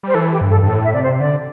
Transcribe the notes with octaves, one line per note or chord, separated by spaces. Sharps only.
G3 C5
E3 A4
G4
G2
A4
G2
A2 A4
E5
C3 D5
C5
D3 D5